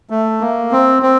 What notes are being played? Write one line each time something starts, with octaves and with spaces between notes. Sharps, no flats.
A3
A#3
C4
C4